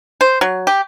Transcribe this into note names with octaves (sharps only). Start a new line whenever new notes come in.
C5
F#3
G4